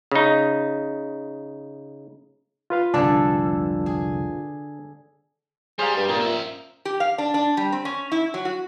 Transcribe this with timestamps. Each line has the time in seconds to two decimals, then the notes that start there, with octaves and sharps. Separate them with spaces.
0.12 C#3 D#4
2.70 F4 B4 F5
2.94 F1 C2 G#2 D3 D4 G#4 A4
3.86 G#4
5.79 G3 G#4 C5 F5 A#5
5.97 G2
6.09 A#2 A#3 D#4 F4
6.20 C#4 E5
6.85 G4
7.00 F5
7.18 D4
7.34 D4
7.57 G3
7.72 C4
7.85 C#4
8.12 E4
8.34 F#3
8.45 F#4